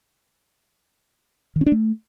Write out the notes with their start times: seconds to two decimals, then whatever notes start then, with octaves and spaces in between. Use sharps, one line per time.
1.56 D#3
1.61 C#4
1.66 D4
1.72 A3